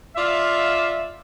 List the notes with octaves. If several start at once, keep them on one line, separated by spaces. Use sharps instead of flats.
F4 D5 E5 F5